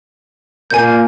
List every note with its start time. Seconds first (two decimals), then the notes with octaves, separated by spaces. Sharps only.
0.71 A#2 A#3 G#5 G6